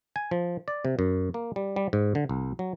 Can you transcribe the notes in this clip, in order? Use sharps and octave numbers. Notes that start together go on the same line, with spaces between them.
G#5
F3
D5
C3
F#2
A#3
G3
G3
G#2
D3
C2
F#3